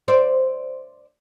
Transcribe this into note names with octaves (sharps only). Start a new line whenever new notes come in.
C5 D5 E5